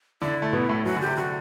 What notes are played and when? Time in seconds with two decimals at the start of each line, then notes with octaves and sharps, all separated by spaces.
0.22 D3 D4 E4
0.42 A3
0.53 B2 B3
0.69 A2 A3
0.85 F#2 F#3 F#4
0.96 D3
1.01 G4
1.06 C3
1.16 D3 F#4